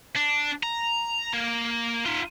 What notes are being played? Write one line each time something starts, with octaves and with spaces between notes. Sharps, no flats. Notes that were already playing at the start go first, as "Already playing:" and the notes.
D4
A#5
A#3
D#4 F4